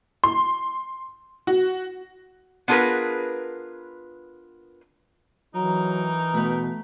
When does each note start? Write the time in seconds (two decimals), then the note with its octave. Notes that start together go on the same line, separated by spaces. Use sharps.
0.24 C6
1.47 F#4
2.68 B3 D4 F4 G#4 A#4 B4
5.55 E3 F#3 D#4 A#4
6.34 B2 A3 B4